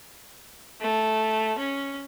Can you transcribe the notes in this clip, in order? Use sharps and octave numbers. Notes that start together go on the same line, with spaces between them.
A3
C#4